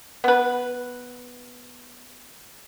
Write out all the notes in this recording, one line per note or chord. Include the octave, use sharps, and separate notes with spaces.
B3 B4